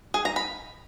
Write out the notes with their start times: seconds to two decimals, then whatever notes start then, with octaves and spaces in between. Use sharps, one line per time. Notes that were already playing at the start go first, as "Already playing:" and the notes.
0.14 G#4
0.25 A#5
0.36 B5